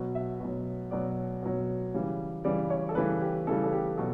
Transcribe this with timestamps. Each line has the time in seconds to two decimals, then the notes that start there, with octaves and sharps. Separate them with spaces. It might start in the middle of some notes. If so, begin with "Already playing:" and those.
Already playing: B2 F#3
0.15 E5
0.40 B2 F#3
0.91 B2 F#3 D5
1.42 B2 F#3
1.94 C#3 E3 G3
2.44 C#3 E3 G3 D5
2.70 C#5
2.89 A4
2.95 C#3 E3 G3 B4
3.22 G4
3.47 C#3 E3 G3 A4
3.63 A4
3.73 G4
3.97 B2 F#3 A4